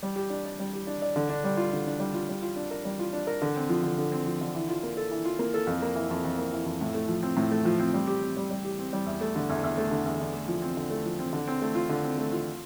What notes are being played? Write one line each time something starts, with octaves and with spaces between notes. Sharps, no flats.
G3
G4
D4
D5
G3
G4
D4
D5
D3
D4
G3
F4
D3
D4
G3
F4
G3
F4
D4
A#4
G3
F4
D4
A#4
D3
C4
F3
D3
D3
C4
F3
D3
E3
F4
A#3
A4
E3
F4
A#3
A4
F2
A#3
E3
F2
F2
A#3
E3
F2
A2
A3
F3
C4
A2
A3
F3
C4
G3
G4
C4
G3
G3
G4
C4
G3
E2
A3
D3
E2
E2
A3
D3
E2
D3
A3
F3
C4
D3
A3
F3
C4
D3
C4
A3
F4
D3
C4
A3
F4